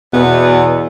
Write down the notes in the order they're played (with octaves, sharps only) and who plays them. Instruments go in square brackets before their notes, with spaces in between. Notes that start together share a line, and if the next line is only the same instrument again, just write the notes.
[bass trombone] E2 [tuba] B2 [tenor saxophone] B3